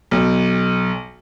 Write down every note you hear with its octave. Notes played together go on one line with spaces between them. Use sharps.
B1